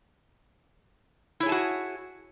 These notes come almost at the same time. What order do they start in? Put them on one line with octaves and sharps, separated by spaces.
E4 C#5 G#4 A5 F#4